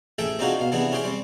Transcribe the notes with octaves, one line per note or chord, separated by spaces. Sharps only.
A1 G#4 A4 E5 G5 D#6
C4 D4 D#4 F4 F#4 G#4
B2 F5
C3 E3 B3 D4 G#4
C#4 G4 G#4 C5 G5
G3 C4